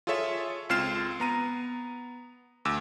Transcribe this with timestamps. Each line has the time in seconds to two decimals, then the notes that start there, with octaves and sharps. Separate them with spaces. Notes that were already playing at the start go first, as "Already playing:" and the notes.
0.07 F4 G#4 A4 C#5 E5
0.69 C#2 C4 F4 F6 C7 E7
1.20 B3 A#5 D#7
2.65 D2 D6 E6